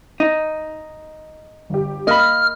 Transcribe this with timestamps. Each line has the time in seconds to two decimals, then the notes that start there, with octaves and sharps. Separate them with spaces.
0.20 D#4
1.70 G1 G4
2.07 A#3 D#5 B5 F6